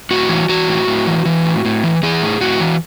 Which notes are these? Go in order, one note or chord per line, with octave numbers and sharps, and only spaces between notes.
A2 F#4
E3
E3 F#4
A2
A2
E3
E3
A2
A2
E3
E3 G#4
A2
A2 F#4
E3